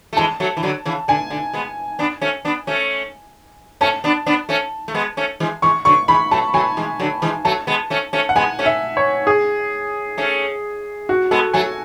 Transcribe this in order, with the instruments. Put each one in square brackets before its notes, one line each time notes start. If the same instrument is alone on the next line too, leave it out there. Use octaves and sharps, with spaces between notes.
[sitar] A3
[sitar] E3 G#3 [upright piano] A5
[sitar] F#3 A3
E3
D3 F#3
C#3 E3
[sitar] D3 [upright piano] G#5
[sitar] D3
G#3 B3
B3 D4
A3 C#4
B3 D4
A3 C#4
[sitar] A3 C#4 [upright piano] A5
[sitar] B3 D4
B3 D4
A3 C#4
A3
G#3 B3
A3 C#4
E3 G#3
[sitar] E3 G#3 [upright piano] C#6
[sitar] D3 F#3 [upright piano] C#6
[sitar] E3 G#3 [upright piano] B5
[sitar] F#3 A3 [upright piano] A5
[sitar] F#3 A3 [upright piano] G#5
[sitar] E3 G#3
D3 F#3
E3 G#3
[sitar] F#3 A3 [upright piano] A5
[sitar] G#3 B3
A3 C#4
A3 C#4
[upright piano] F#5
[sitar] G#3 B3 [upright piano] G#5
[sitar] A3 C#4
[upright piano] E5
C#5
G#4
[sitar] A3 C#4
[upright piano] F#4
[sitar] G#3 B3 [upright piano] A4
[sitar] F#3 A3 [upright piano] G#5